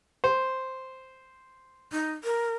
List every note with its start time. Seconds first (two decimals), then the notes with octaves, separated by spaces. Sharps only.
0.24 C5
1.92 D#4
2.24 A#4